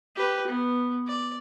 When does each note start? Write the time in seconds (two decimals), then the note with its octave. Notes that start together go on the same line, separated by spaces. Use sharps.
0.16 G4 B4
0.47 B3
1.07 D5